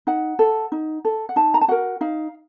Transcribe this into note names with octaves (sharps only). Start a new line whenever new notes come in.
D#4 F#5
A4
D#4
A4
F#5
D#4 A5
A#5
A5
F#4 A#4 F#5
D#4 F5